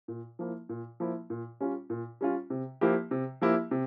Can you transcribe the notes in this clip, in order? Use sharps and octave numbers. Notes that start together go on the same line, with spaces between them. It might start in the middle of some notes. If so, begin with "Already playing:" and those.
A#2
F3 A#3 E4
A#2
F3 A#3 E4
A#2
G3 C#4 F4
A#2
G3 C#4 F4
C3
F3 A#3 E4 G4
C3
F3 A#3 E4 G4
C3